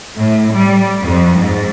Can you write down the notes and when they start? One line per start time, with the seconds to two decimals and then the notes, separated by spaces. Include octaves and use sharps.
0.18 A2
0.52 G3
1.03 F2
1.38 G#2